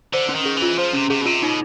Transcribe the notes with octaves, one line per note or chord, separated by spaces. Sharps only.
D3 C5
C#4
D#3
G#4
E3
F4
F3 C5
C3 C#4
C3 G#4
B2
C3 F4
B2 D#4